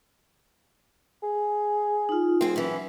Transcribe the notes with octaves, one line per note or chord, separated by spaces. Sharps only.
G#4
D#4 F4
F#3 C4 G#4
E3 C#4